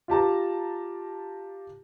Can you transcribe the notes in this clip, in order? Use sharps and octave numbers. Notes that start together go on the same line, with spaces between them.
F4 G4 A5 A#5